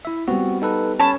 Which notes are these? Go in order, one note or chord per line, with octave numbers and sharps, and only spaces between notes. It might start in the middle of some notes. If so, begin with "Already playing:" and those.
E4 E5
G3 B3 C4 F#4
D#4 A4 B4
C#4 C#5 A5 B5